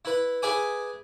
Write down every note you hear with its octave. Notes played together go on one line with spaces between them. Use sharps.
E4 B4
G#4 B4 E5 G#5 D6 D#6